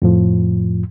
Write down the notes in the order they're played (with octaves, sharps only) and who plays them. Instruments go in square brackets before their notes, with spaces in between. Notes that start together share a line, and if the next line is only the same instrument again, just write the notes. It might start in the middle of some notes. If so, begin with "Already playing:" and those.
[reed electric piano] F2 A2 F3